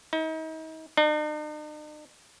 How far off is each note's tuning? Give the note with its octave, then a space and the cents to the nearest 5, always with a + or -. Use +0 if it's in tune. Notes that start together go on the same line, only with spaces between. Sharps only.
D#4 +40
D#4 -45